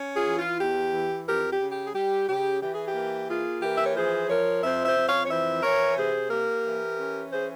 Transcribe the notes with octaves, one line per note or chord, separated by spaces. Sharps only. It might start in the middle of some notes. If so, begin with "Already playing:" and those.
Already playing: C#4
F4 G#4
E3
F4
E2 G4
E3
F2 G4 A#4
G4
C#3
G4
G#4
G3 G4
C#3 G4
E3 G4
G#4
G4
A#3
A#3 F4 G#4
E3 G4 A#4
E5
C#5
F3 G#4 C5
F3 A#4 C#5
F2 C5 E5
C5 E5
F2
C#5 F5
C#5
E3 C5 E5
E3 A#4 C#5
C3 G#4 C5
A#3 G4 A#4
E3
C#4
E3 G#4 C5